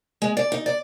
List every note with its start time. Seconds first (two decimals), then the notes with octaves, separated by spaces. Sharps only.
0.22 G#3
0.37 D5
0.52 D#4
0.66 D5